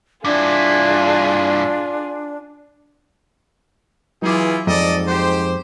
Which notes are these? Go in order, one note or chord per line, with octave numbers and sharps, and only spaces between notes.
G2 D4 E4 F4 G#4
E3 F#3 E4 F4 G#4 D6
F2 G#2 A4 D5 D#5
G4 C5